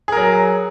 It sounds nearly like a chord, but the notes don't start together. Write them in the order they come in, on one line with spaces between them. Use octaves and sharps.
G#4 A#4 F#3